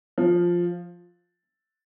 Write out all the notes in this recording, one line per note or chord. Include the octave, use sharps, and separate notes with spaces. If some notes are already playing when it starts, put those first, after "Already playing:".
F3